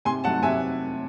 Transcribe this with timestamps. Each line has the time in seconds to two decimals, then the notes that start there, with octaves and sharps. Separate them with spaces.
0.05 C3 G#5 C6
0.24 F#3 A3 F#5 A5
0.43 C3 E5 G#5